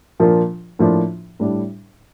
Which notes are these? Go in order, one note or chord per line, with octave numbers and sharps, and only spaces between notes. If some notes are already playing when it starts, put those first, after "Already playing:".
A#2 F3 A#3 D4 F4
A2 F3 A#3 D4 F4
A2 G3 D4